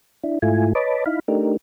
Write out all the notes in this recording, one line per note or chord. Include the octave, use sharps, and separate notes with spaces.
D4 E4
G#2 A3 E4 F4 G#5
B4 C#5 D#5 A5 B5 D6
D#4 E4 F5 B5
A3 D4 D#4 G4 A#4